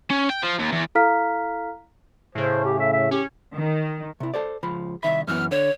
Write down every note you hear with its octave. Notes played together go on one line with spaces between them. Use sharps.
C#4
G5
F3
D#2
E2
E4 A4 F5 A#5 F6 B6
A2 C#3 C5
G4
E5
E5
C#4 G4
D#3
C3 E4
A4 C5 D5
C#2 F3 B5
C2 D#3 E5 B5
F#2 E3 B3 F6
D3 C#5